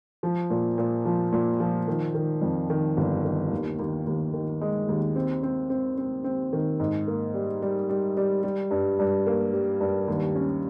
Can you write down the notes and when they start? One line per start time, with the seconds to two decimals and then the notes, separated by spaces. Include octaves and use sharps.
0.23 F3
0.50 A#2
0.78 A#2
1.05 F3
1.33 A#2
1.60 F3
1.88 D#3
2.15 D#3
2.42 F2
2.70 D#3
2.97 G1
3.25 D#3
3.52 D#2
3.79 D#2
4.07 D#2
4.34 D#3
4.61 G#3
4.88 D#2
5.16 C4
5.43 C4
5.70 C4
5.98 C4
6.24 C4
6.53 D#3
6.80 G#2
7.08 A#3
7.34 G3
7.62 G3
7.89 G3
8.17 G3
8.43 G3
8.71 G2
8.99 G2
9.26 A#3
9.53 G3
9.81 G2
10.08 D#2
10.35 C#4